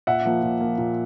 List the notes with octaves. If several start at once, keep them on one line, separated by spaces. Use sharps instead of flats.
A#2 E5 F#5
F3 A#3
A#2
F3 A#3
A#2